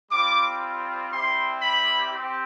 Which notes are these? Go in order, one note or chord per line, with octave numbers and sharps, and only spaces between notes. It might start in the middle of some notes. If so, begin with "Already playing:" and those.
G3 C4 F4 D6
G3 C4 E4 G4 C6
B5
C4 G4